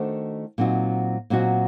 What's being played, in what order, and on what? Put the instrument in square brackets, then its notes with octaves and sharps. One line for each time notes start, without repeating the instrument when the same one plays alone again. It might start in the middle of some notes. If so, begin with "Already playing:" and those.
Already playing: [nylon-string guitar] D#3 A3 D4 F#4 C5
A#2 F#3 C4 D#4 F#4
A#2 F#3 C4 D#4 F#4